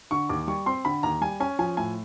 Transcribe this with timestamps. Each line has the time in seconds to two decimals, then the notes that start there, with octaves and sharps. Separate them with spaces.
0.11 D3 C#6
0.29 D#2 D6
0.48 G3 C#6
0.66 C4 C6
0.85 D3 B5
1.03 D#2 A#5
1.21 G3 G#5
1.40 C#4 G#5
1.59 F3 G#5
1.77 A2 G#5